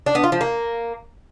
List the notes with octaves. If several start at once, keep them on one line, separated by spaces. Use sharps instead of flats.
D4
B3
F4
F3
A#3